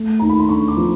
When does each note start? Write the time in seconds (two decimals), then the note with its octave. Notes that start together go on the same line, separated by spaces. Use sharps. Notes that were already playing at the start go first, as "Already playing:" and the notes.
Already playing: A3
0.19 D#2 A#5
0.29 B5
0.40 C6
0.49 D3 C#6
0.68 D6
0.77 F3